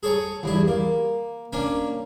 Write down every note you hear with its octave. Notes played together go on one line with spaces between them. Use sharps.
G#4 A4 C#5 G#5 A#5
E2 G2 E4
A#3
A#3 C#4 D4